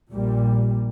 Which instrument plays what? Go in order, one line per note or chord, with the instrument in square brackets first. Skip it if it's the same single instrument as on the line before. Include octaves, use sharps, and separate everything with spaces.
[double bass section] A#1 A#2 G3